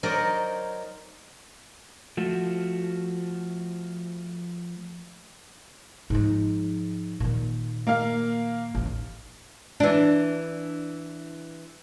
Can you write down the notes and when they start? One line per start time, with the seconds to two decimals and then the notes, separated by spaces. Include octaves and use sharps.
0.03 F#3 D#4 A#4 C5 D5 D#5
2.17 F3 A3 F#4
6.10 G#2 F3
7.20 A#2 D#3
7.87 A#3 F5
8.75 A1 D#2
9.80 E3 D4